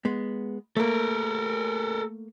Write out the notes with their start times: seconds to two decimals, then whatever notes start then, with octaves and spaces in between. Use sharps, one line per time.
0.05 G#3 B3
0.77 A3 A#3 A4 A#4